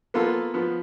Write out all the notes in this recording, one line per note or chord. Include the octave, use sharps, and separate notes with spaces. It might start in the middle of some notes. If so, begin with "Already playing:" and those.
A#3 B3 F4 A4
F3 B3